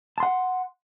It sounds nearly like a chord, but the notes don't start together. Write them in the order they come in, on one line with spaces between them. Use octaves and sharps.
A5 C6 F#5